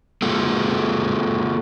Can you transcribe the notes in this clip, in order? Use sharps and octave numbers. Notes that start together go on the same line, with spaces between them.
A#3 F4 F#4 G#4 A4